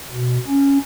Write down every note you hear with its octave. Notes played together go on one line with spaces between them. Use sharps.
B2
C#4